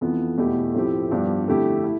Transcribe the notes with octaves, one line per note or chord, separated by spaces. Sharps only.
F2 E3 B3 F4
E2 B2 A3 E4 G4
A2 F3 C4 E4 G4
G2 F3 B3 D4 G4
F2 D3 A3 E4 G4
E4